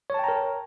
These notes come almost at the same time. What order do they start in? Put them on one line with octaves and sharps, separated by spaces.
C#5 A5 G5 A#5 A#4